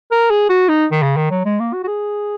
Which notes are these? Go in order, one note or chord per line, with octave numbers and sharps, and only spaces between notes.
A#4
G#4
F#4
D#4
D#3
C#3
D#3
F#3
G#3
A#3
F#4
F#4
G#4